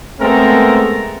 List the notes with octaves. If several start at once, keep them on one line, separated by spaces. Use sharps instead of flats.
G#3 A3 B3 C4 A4 A#4